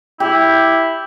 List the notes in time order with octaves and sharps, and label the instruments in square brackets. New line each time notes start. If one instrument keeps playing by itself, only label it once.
[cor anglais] E4 [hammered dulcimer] G4